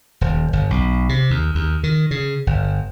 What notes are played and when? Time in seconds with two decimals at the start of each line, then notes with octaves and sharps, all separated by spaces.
0.21 D#1
0.53 G1
0.70 B1
1.09 C3
1.30 D#2
1.55 D#2
1.83 D#3
2.11 C#3
2.47 G1